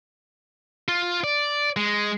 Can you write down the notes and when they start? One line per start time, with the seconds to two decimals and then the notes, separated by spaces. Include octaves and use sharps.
0.88 F4
1.24 D5
1.77 G#3